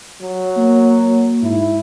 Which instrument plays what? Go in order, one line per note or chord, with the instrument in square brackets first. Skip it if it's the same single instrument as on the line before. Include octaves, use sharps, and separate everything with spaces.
[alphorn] F#3
[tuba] A#3
[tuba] G#2 [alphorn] E4